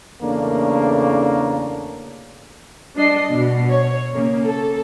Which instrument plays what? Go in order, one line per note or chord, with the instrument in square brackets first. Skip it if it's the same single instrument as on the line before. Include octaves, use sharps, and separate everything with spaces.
[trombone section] E2 C#3 A3 A#3 D4
[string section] G3 D4 D#5 C7
B2
C#5
C#3 A#3
A4